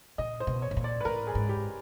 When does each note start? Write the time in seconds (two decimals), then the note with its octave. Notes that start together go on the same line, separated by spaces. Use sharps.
0.18 A#2 D#5
0.40 C5
0.47 B2
0.62 C#5
0.71 A2
0.77 A#2
0.84 D5
1.01 B4
1.05 A2 A#4
1.27 G#4
1.35 G#2
1.49 G4